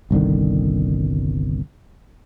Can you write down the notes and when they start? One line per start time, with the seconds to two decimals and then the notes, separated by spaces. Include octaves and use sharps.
0.11 G1 C2 D3 D#3